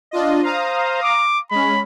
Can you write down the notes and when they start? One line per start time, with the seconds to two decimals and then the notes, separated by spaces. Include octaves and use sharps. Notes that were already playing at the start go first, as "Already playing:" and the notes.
0.11 D4 F4 D#5
0.43 C5 F5 A#5 D#6
1.03 D6
1.51 G#3 C#4 B5